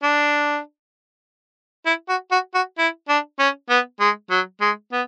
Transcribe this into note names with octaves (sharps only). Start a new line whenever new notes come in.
D4
E4
F#4
F#4
F#4
E4
D4
C#4
B3
G#3
F#3
G#3
B3